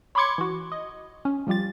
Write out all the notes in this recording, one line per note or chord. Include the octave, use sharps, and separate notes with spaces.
C#5 B5 C6 D6 G#6 C#7
E3 F#4
D#5
C#4
F3 G3 F4 G4 A6